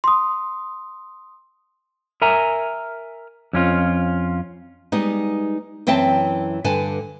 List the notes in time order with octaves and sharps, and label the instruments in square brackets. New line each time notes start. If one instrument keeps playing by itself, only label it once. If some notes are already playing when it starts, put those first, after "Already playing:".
[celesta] C6 D#6
[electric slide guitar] A#4 E5 G#5 A#5
F2 C#4 F4
[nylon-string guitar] G3 G#3 B3 D#4
F#2 E3 C4 E5 G5 A5
G2 D3 B4 G#5 A5